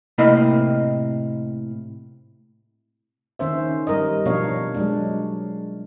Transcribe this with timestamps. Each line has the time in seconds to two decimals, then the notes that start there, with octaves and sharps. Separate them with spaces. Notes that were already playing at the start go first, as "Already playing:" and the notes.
0.18 A2 C3 A#3 C4 E4 D#5
3.39 D#3 C#4 C5 E5
3.87 G3 A#4 D#5
4.25 B2 F3 D4 C#5 F5
4.74 F#3 G#3 D4